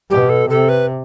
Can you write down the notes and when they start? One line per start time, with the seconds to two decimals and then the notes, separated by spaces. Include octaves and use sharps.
0.10 B2 G4
0.29 A4
0.49 C3 A4
0.69 B4